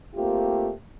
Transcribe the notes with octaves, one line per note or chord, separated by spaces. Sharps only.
A3 A#3 C4 F4 G4